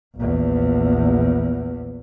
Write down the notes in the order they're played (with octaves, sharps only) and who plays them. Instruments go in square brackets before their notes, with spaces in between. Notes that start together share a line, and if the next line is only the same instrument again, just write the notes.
[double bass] A#1 E2